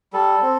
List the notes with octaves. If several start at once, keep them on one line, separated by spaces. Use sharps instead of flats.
G3 A4
C4